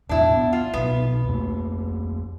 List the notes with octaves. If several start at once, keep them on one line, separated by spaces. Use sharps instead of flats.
B1 E2 A2 D4 E4
B3
F4
C2 B2 B3
F2 A3 A#3